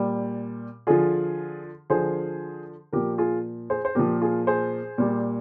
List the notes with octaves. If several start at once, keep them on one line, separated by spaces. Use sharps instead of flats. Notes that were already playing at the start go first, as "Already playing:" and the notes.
Already playing: A#2 G3
D3 F3 F4 G#4
D3 F3 G#4 C5
A#2 F3 G4 A#4
F4 G#4
G#4 C5
C5
A#2 F3 G4 A#4
F4 G#4
G#4 C5
A#2 G3